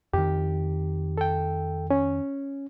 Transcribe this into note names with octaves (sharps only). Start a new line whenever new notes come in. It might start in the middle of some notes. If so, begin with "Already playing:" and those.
F2 D#3 G4
A4 G5
C#4